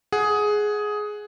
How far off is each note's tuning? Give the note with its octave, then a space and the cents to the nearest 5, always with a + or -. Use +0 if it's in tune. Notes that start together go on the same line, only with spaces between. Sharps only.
G#4 +10 F#5 +0